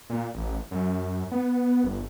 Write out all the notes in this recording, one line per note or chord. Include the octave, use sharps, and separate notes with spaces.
A#2
A1
F#2
B3
G1